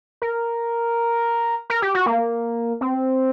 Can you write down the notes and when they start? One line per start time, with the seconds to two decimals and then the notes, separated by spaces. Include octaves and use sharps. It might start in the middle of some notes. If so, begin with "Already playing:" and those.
0.22 A#4
1.70 A#4
1.82 G4
1.95 F#4
2.06 A#3
2.81 C4